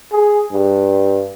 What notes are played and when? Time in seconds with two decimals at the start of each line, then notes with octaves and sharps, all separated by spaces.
0.12 G#4
0.52 G2